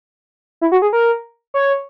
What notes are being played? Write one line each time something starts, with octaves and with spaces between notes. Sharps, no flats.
E4
F#4
G#4
A#4
C#5